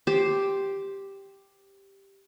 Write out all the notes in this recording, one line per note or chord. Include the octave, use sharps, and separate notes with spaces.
G4 C5